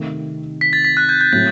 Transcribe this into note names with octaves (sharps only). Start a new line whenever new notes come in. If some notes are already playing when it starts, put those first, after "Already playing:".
Already playing: C3 D#3 A3 C4
B6
A6
B6
F#6
G6
G6
A2 F#3 C4 A6